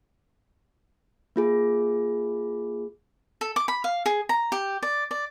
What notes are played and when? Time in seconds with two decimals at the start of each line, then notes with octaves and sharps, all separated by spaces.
1.36 A#3 F4 G#4
3.41 A4
3.56 D6
3.68 B5
3.84 F5
4.06 G#4
4.29 A#5
4.52 G4
4.83 D5
5.11 D5